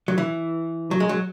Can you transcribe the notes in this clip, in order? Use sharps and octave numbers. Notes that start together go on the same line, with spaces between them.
F#3
E3
F#3
G#3
F#3